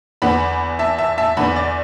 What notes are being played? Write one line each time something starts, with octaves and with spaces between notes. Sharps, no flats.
E2 D3 B3 F#5 B5
E5 A5
E5 A5
E5 A5
E2 D3 B3 F#5 B5
D5